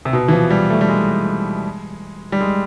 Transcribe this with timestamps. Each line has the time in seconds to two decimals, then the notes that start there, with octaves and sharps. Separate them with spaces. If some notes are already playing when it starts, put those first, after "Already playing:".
0.05 C3
0.13 B2
0.28 E3
0.32 F3
0.50 G3
0.70 A3
0.81 G3
0.89 G#3
2.32 G3
2.41 G#3